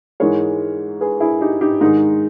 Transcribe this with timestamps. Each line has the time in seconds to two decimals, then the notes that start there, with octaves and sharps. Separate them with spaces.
0.20 G#2 E3 G#3 A#4 C#5
1.01 G#4 B4
1.20 E4 G#4
1.41 D#4 G4
1.61 D#4 G4
1.81 G#2 D#3 G#3 D#4